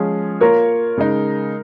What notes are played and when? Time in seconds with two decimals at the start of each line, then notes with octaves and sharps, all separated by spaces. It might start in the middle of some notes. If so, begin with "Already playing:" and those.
Already playing: F3 G#3 C#4 F4 G#4
0.41 A#3 F4 A#4 C#5
0.97 C#3 G#3 D#4